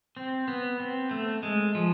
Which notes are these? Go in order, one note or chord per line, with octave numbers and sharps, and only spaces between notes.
C4
B3
C4
A3
G#3
F3